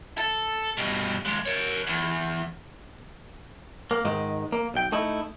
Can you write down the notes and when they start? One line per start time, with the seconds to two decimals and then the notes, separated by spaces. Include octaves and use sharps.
0.18 A4
0.77 G2 B2
1.25 D#2 G#3
1.46 A#4 C#5
1.87 E2
3.91 A#3
4.05 G#2 D#3 G#3
4.52 A#3
4.74 B1 G5
4.92 A3 D#4 E4